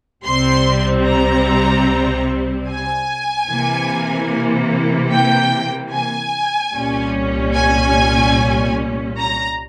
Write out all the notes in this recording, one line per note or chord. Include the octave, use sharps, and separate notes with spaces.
C2 C3 G3 C4 C6
A#5
G#5
C3 E3 A#3
G5
G#5
C2 A#2 G3 C#4
G#5
A#5